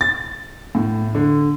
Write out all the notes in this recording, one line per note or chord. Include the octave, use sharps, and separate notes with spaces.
A6
A2
D3